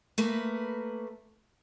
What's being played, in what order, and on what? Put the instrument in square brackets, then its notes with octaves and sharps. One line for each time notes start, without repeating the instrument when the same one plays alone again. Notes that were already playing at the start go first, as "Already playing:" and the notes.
[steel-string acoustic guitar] A3 A#3 B4